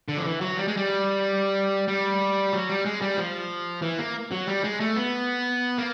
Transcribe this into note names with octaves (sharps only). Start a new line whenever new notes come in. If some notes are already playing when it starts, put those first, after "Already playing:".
D3
F3
E3
F#3
G3
G#3
G3
G3
F#3
G3
G#3
G3
F3
E3
A#3
F#3
G3
G#3
A3
B3
A#3